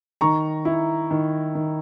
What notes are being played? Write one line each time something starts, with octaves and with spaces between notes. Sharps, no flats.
D#3 A#5 C#6
E4
D#3
D#3